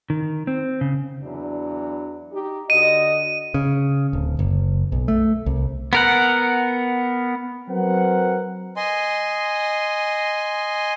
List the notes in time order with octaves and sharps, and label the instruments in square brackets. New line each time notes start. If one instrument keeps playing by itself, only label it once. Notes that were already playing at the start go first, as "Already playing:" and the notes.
[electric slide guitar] D#3
C4
C#3
[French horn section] E2 F#3 D4
D#4 G4
[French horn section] D3 F#4 D#5 [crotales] D#7
[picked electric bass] C#3
D1
F#1
B1
A3
C2
[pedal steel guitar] B3 A#4 F#5
[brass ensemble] F#3 C4 A#4 B4 F#5
[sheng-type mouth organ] D#5 G#5 C6